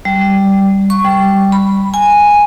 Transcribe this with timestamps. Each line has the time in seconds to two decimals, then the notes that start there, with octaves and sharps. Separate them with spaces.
0.05 G3
0.90 C#6
1.05 G3
1.52 B5
1.94 G#5